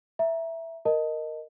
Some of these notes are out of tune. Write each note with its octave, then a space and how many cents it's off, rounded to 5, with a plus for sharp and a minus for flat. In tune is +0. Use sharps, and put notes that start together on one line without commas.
E5 +0 A#5 +20
A#4 -5 D#5 +0 A5 +20